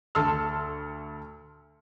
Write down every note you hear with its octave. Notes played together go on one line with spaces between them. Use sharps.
D2 A4 A5 C6 E6 F6